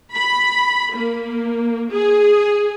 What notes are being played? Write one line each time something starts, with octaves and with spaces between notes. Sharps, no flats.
B5
A#3
G#4